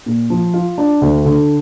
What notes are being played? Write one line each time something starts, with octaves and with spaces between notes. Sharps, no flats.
A#2
F3
F4
D4
D2
D3